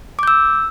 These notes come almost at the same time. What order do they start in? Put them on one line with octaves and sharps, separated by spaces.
D6 G6 E6